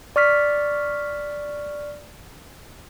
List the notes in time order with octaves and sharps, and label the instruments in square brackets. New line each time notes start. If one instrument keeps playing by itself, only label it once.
[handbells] D5 C#6 F6 B6